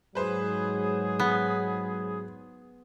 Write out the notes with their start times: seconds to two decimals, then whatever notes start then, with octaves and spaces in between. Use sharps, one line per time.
0.15 G#2 F#3 G#4 B4 C5
1.20 B3